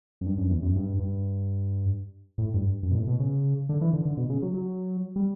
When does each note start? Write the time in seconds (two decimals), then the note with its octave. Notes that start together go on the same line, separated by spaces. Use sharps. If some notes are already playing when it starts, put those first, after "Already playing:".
0.21 F#2
0.26 G2
0.38 F#2
0.50 E2
0.62 F#2
0.76 G2
0.99 G2
2.38 A2
2.54 G2
2.83 F#2
2.91 B2
2.96 A2
3.08 B2
3.20 C#3
3.69 D3
3.81 E3
3.93 D3
4.05 D3
4.17 B2
4.30 C#3
4.42 F#3
4.54 F#3
5.16 G3